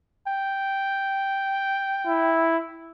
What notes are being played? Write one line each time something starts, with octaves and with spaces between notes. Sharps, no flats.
G5
E4